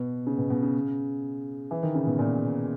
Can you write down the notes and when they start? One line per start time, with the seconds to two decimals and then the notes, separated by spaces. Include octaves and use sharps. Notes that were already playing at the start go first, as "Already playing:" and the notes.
Already playing: B2
0.27 C#3
0.38 B2
0.50 B2
0.62 C#3
1.71 E3
1.83 D#3
1.95 C#3
2.07 B2
2.19 A#2